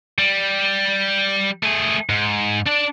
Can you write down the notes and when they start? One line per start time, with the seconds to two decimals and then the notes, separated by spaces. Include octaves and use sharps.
0.18 G3
1.63 A3 G#4
2.09 G#2
2.67 D4 D5